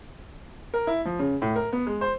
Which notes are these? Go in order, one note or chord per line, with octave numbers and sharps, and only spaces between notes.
A#4
E4
F3
C#3
A2
A#4
B3
G#3
C5